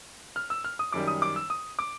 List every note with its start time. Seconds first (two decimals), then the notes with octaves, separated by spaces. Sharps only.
0.36 F6
0.50 E6
0.64 F6
0.79 D#6
0.92 F#2 D#3 G3 D6
1.07 D#6
1.22 D6
1.36 E6
1.50 D#6
1.79 D6